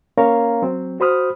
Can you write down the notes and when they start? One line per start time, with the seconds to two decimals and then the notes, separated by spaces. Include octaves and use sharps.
0.17 A#3 C#4 A#4 C#5 F5 A#5
0.62 F#3 C4
1.00 F#4 C5 B5 D#6 F6